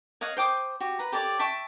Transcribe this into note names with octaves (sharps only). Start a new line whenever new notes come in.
C#5 D#5 F5 F#5
C5 G5 D6 D#6
F#4 G4
B4 A#5
G4 A4 C#5 D5
E5 G5 A5 C#6